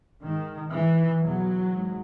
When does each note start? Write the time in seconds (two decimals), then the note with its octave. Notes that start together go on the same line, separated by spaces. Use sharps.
0.23 G#2 D#3
0.73 G#2 E3
1.22 E2 B2 F#3
1.72 G#2